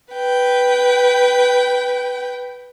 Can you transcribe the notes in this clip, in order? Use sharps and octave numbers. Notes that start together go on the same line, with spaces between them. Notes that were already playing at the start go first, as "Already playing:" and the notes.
B4 G5